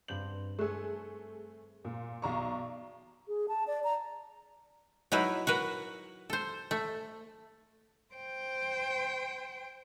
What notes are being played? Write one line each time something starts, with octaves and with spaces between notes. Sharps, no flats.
G2 C4 G6 F#7
A3 G#4 C#6 E6 F#6
A#2
B1 D5 A#5 C#6 C7
G#4
A5
D5
A#5
F#3 D#4 E4 B4
F#4 A#4 B4
A4 C5
A3
C5 G5